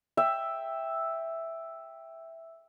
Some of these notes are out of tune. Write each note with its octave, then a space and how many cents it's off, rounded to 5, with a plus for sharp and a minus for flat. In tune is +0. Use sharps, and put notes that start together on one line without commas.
E5 +0 G5 +10